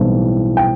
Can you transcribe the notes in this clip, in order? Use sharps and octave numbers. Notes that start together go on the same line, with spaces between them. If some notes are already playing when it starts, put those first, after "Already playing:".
Already playing: B1 A2 E3 G3 C4
G5